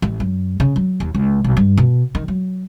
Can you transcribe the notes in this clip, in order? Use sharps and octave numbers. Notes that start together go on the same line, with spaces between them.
A1
F#2
C#3
F#3
D#2
C#2
B1
G2
B2
D#3
F#3